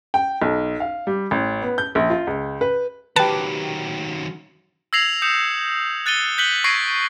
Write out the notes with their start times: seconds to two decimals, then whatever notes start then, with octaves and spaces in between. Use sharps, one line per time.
0.14 G5
0.42 B1
0.80 F5
1.07 G3
1.31 A1
1.62 B3
1.78 G6
1.95 A#1
2.10 F4
2.27 C#2
2.61 B4
3.16 D#3 F#3 G4 B4 A5
4.93 E6 G#6 A#6 C7 F7 F#7
5.22 D#6 G6 C#7 E7
6.06 F#6 A6 C#7 D#7 G7
6.38 F#6 G6 B6 C#7 F#7 G7
6.64 C#6 G#6 A#6 C7 D7